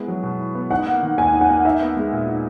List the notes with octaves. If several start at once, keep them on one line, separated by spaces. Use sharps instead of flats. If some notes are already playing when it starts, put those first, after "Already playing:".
Already playing: G#3 B3 E4
F#3
B2
E4
B3
D#4 F#5
A#3
D#3
D#2 G#5
D#4
F#5
A#3
D#4 E5
B3
G#3
A#2
D#4